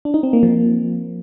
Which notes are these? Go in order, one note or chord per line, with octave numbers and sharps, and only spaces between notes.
D4
D#4
C4
A#3
F3